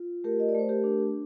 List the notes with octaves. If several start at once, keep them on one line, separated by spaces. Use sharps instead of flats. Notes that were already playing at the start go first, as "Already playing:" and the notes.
Already playing: F4
A3 G4 A#4
D#5
D5
A3 C5
G4 A#4
D4